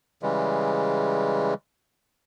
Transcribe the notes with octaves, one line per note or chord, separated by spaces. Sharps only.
C#3 E3 G3 G#3